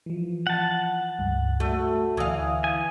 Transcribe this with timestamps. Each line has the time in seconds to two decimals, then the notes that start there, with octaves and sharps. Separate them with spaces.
0.06 E3 F3
0.47 F#5 A5
1.19 C#2 G2
1.60 A3 F#4
2.17 D2 E3 F5 D#6
2.64 G#5 D#6